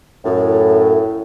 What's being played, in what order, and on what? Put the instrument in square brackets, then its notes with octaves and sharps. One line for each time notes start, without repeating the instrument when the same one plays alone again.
[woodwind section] F#2 A2